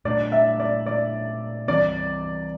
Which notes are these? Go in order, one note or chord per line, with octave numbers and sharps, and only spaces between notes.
A#2 A3 D4 D5
E5
D5
D5
E3 G3 C4 D5